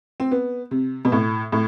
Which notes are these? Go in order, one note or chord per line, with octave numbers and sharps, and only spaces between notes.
C4
B3
C3
B2
A2
A2